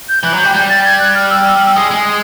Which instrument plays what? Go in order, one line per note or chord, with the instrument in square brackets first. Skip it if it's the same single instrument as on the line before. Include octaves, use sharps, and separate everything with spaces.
[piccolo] G6
[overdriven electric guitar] E3 [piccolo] F#6
[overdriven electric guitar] F#3
[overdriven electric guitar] G3 [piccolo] G6
[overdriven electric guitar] G3 [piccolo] G6
[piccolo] A6
G#6
F#6
F6
E6
F6
E6
F6
E6
[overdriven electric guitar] G#3 [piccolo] D#6
[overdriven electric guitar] G#3